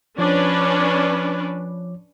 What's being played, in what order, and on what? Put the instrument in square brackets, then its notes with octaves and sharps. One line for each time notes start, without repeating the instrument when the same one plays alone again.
[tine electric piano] F3 C#5 D6 [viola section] C#4 D4 B4